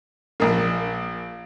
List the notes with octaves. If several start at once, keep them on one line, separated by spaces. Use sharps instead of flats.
A#1 A#3